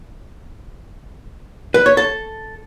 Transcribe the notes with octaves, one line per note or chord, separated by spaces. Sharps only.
B4
C#5
A4